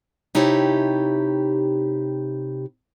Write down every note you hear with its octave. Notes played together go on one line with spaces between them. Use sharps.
C3 D#4 E4 G4 C#5 A5